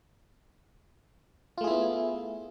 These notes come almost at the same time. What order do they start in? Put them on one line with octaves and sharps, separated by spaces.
F4 A3 G#4 E4 B3